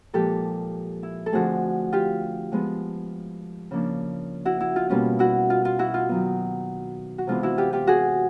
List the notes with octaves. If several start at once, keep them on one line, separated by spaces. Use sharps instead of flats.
A#2 F3 G#3 G4 A4
E4
A4
D3 F3 A3 C4 D#4 F#4 G#4
F4 G4
F3 G#3 B3
C#3 F3 A#3 D4
E4 F#4
E4
F4
B2 G3 A#3 C#4 F4
E4 F#4
F4
F4
E4 F#4
F4
D#3 F#3 B3
F#4
C3 E3 G#3 B3 D4 F4
E4 F#4
F4 G4
F4 G4
F#4 G#4